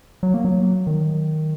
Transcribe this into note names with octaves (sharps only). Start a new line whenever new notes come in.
F#3
A#3
F#3
D#3